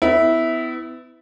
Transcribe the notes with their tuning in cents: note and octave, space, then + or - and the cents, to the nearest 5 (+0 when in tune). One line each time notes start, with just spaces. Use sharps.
B3 +35 E4 -10